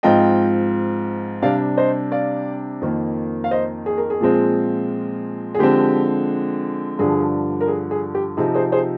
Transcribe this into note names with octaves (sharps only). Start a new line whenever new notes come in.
G#2 F3 C4 F4 D#5 G5
C3 G3 D4 D5 F5
C5 D#5
D5 F5
F2 D#3 A#3
F5
C5 D#5
G#4
A#4
G#4
A#2 F3 G#3 C4
G#4
D3 F3 G#3 C4 G4
G2 D3 F3 G#4
A#4
G#4
G#4
G4
C3 F3 C4 D#4 G#4
G#4 C5
G#4 C5